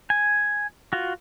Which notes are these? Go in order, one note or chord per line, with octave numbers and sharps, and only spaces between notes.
G#5
F4 F#4